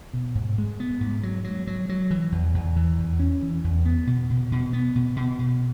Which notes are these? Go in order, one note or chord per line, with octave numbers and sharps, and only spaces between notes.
B2
G#2
G#3
B3
G#2
F#3
F#3
F#3
F#3
E3
E2
E2
E3
E2
C#4
E3
E2
B3
B2
B2
B2
B3
B2
B2
B2